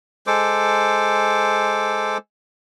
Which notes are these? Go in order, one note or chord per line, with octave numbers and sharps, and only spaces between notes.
G#3 A4 C5 D6